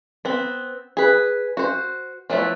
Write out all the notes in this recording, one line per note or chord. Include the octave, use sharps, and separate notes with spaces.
B3 C4
G#4 B4
F#4 C5
F3 F#3 A3 B3 E4